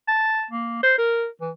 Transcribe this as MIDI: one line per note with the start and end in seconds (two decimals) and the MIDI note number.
0.08 0.45 81
0.51 0.82 58
0.83 0.94 72
0.98 1.27 70
1.41 1.51 52